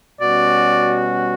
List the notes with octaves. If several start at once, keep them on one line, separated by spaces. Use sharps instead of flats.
B2 G3 C#4 F#4 D5